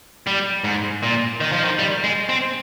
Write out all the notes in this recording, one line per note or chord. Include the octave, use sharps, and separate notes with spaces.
G3
G#2
A#2
D#3
F3
D#3
G3
G#3
C4